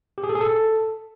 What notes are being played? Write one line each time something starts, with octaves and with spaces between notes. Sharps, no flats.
G4
G#4
A4
G#4
A4